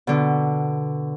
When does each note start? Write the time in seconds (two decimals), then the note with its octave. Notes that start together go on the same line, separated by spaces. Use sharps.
0.07 B2 D3